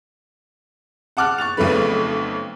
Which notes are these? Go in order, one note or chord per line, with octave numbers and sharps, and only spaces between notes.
F#5 A5 D6 F6 F#6
C#6 A6 F7
B1 F2 C#3 A3 B4